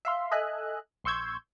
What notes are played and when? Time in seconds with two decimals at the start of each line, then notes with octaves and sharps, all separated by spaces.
0.05 E5 F5 C6
0.31 A4 D#5 E5 G#5 F#6
1.04 A#1 C6 C#6 E6 G6 G#6